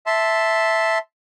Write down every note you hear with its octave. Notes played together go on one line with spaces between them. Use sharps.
E5 A5 C6